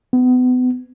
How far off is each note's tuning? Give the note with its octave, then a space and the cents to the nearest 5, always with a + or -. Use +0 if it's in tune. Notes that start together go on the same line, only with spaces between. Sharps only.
B3 +30